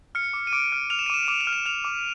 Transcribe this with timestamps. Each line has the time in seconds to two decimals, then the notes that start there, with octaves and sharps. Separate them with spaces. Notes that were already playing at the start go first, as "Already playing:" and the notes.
0.15 F6 C#7
0.33 D6
0.47 D#7
0.53 D6 D7
0.72 F6
0.90 F6 F7
0.99 E7
1.06 D#7
1.10 D6 E7
1.28 D6 E7
1.41 F7
1.47 F6
1.53 E7
1.66 F6 F7
1.85 D6